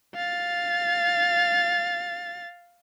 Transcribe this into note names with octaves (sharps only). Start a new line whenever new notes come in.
F5 A6